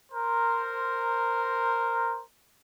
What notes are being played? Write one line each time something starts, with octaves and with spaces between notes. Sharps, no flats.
A#4 C5